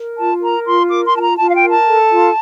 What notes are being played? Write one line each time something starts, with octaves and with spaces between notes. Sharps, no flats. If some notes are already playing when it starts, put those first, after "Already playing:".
Already playing: A#4
F4 A5
A#4 A#5
F4 C6
A#4 D6
C6
F4 A5
A#5
F4 A5
F5
G5
A#4
A5
A4
F4